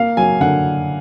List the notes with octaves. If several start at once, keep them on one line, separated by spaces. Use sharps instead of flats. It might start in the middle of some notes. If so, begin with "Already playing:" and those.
Already playing: A#3 F5
F#3 G#5
D3 F#5